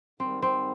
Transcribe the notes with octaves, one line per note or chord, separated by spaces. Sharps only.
G#2 D#3 G3 C4
C4